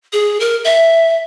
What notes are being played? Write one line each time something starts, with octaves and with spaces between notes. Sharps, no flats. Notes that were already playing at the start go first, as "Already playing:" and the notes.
G#4
A#4
E5